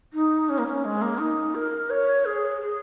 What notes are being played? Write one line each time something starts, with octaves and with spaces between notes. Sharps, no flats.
D#4
C#4
A#3
C#4
G#3
A#3
D#4
A#4
C#5
G#4
G#4